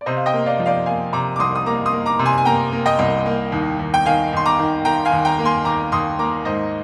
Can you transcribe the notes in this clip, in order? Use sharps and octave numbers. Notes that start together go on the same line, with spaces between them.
D5
C3 C5 D#5
F5
D#5 G5
A#3
D5 F5
F3
D5 F5
A#3 F5 G#5
C3 A#5 D6
D6
C2 C6 D#6
D#6
A#3 A#5 D6
C6 D#6
A#3
A#5 D6
C3
G#5 C6
G#5
A#3 G5 A#5
A#3
D#5 G5
C2
A#3
D#2
D#2
G5
D#3 F5 G#5
D#2 C6
A#5 D6
D#3
D#3 G5 A#5
F5 G#5
D#2
G5 A#5
A#3
G#5 C6
D#2 A#5 D6
D#2 C6 D#6
A#3 A#5 D6
G#2 C5 D#5